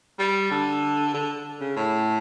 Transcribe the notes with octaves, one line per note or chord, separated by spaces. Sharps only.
G3
D3
D3
C#3
A2